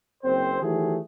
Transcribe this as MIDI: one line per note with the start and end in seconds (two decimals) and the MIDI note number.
0.24 0.61 30
0.24 0.61 60
0.24 0.61 72
0.62 0.97 51
0.62 0.97 52
0.62 0.97 54
0.62 0.97 57
0.62 0.97 67
0.62 0.97 68